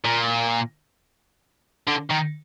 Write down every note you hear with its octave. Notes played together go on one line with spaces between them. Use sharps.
A#2
D3
D#3